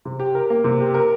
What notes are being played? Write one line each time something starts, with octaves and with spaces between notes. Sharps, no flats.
C3
G4
A#4
A#3
C3
G4
A#4